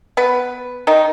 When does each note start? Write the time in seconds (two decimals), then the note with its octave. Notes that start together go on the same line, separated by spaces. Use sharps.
0.17 B3 B4
0.87 D#3 D#4